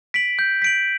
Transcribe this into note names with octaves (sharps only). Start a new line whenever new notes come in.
B6 D7 F#7
G6
B6 D7 F#7